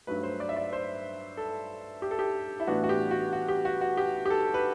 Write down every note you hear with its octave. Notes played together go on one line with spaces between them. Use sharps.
G2 F#3 A3 B4
C5
D5
E5
D5
C5
A4
G4
A4
G4
E4
A2 E3 B3 D4 F#4
F#4
G4
F#4
F#4
G4
F#4
F#4
G4
G4
A4
B4